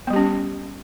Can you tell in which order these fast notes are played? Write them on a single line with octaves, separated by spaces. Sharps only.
B3 G3 G4 C#4